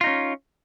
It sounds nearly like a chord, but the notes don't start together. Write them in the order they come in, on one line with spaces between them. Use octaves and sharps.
F4 D#4 C#4